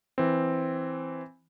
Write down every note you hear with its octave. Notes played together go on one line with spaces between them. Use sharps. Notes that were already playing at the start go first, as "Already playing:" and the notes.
E3 C4